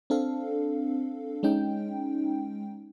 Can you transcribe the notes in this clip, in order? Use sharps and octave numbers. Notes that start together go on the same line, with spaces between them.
C4 D4 A4 F5
G#3 C#4 D#4 G5